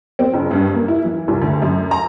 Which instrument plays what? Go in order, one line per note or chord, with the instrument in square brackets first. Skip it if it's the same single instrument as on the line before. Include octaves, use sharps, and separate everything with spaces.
[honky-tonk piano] C4
F#1
G2
A#3
E4
E3
C2
D2
F#2
A#5